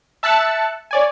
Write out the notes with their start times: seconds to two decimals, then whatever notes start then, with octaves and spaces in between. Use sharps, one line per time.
0.23 E5 A5 E6 F#6 A6 C#7
0.91 C#5 D5 G#5